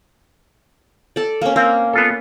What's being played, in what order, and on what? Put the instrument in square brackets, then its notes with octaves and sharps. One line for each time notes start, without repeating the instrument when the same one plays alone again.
[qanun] A4 D5
A#3 C#4
[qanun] A#3 [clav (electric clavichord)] C4
[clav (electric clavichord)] B3 F4 A4